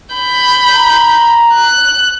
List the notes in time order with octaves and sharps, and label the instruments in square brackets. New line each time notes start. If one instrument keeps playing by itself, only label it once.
[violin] B5 G6
[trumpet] A#5
[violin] F#6